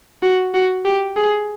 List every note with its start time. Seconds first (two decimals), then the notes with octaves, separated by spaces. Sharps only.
0.23 F#4
0.54 F#4
0.85 G4
1.16 G#4